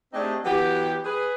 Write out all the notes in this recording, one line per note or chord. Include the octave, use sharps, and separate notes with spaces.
A3 C4 D4 D#4 G4 G#4
E3 F#3 B3 G4
G#4 B4